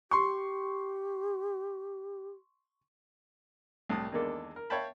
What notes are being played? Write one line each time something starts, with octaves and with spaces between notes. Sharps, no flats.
G4 C6 C#6
C2 A2 A5 D#6
E2 D#3 G#3 A#3 D4 A4
A#4
C#5 E5 F5 G5 A5 B5